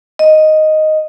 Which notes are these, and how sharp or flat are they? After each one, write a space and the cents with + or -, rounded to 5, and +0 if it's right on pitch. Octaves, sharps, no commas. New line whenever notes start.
D#5 +0